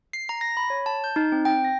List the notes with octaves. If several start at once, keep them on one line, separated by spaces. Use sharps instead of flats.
C7
A#5
A#6
B5
C#5
A5
G6
D#4
C4
G5
A#6